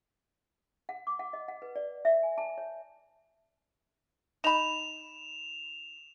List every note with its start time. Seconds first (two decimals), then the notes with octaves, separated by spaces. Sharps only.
0.89 F#5
1.07 D6
1.19 F#5
1.33 D#5
1.48 F#5
1.62 B4
1.76 D5
2.05 E5
2.23 G#5
2.38 A5
2.58 C#5
4.44 D#4 B5 E7 F7